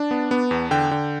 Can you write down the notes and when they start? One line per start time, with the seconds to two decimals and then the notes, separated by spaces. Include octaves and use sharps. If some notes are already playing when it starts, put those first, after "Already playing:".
Already playing: D4 A5
0.11 B3
0.31 B3
0.51 E2
0.71 D3 G5
0.91 D3